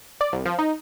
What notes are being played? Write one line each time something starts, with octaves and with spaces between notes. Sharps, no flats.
D5
C2
F3
D#4